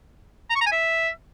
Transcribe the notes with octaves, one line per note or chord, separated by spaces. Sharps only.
A#5
C#6
A#5
G#5
E5